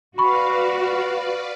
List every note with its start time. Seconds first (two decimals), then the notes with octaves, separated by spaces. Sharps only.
0.18 F#4 B4 D5 F5 B5 C#6